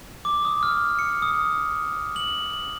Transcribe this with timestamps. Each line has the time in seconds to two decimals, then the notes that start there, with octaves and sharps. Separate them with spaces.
0.25 D6
0.45 D#6
0.63 F6
0.99 C#7
1.22 D#6
2.16 F#7
2.53 F#7